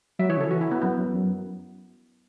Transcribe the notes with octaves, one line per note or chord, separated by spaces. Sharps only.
F#3 E5
E3 C#5
C#3 A4
E3 F#4
E4
B3
F#2 B3
F#2
F#2